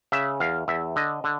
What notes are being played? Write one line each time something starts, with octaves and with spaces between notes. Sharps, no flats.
C#3 E5
E2 F5
E2 E5
D3 D#5
D3